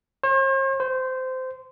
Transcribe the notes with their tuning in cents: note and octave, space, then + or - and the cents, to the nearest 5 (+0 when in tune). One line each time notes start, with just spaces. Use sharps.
C5 +45
C5 -20